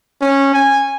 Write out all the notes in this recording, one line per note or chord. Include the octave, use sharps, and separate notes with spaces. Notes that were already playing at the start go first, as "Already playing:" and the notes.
C#4
G#5